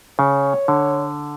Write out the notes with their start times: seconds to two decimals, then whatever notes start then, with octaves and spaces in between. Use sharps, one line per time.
0.19 C#3 C#5
0.68 D3